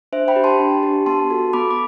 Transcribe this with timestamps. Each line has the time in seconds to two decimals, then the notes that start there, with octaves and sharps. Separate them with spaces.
0.12 D4 C5 E5
0.28 G5 B5
0.36 G4
0.44 A5 C6
0.59 D4
0.83 G4
1.06 B3 A5 C6
1.30 F#4 A4
1.53 B3 B5 D6
1.71 D6